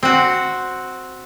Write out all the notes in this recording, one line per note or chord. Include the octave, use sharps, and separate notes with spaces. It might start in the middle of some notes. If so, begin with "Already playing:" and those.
C4 F#4